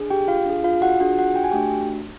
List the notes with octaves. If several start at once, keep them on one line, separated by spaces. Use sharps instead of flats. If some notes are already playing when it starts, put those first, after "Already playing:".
Already playing: D4 G#4
G4 G5
F4 F5
D4 F4 G#4
F4 F5
F#4 F#5
D4 F4 F#4 G#4 F#5
F#4 F#5
G5
G#5
A3 D4 F#4 G4 G5